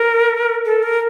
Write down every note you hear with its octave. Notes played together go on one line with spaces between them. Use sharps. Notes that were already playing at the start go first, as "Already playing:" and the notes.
Already playing: A#4
A4
A#4